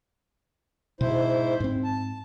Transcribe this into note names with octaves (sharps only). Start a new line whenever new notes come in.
G#2 B2 E4 C5
G#2 C4
A5